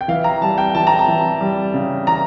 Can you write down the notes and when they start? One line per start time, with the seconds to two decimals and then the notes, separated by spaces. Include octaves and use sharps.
0.01 G5
0.08 E3 F5
0.24 A#5
0.42 G3 A5
0.58 G5
0.75 E3 A5
0.87 A#5
0.99 A5
1.08 E3
1.41 G3
1.74 C#3
2.07 E3 A#5